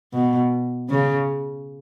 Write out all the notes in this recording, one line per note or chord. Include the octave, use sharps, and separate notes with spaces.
B2
C#3